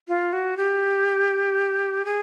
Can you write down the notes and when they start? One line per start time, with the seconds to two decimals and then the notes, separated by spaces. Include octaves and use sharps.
0.08 F4
0.33 F#4
0.57 G4
2.05 G#4